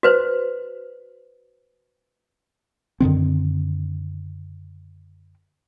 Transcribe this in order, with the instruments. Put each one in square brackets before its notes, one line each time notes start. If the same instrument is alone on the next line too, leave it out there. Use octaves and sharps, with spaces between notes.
[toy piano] F#4 B4 C5
[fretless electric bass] F#2 D3 D#3 C4